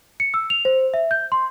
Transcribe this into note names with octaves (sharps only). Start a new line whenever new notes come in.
C#7
E6
F7
C5
E5
G6
C6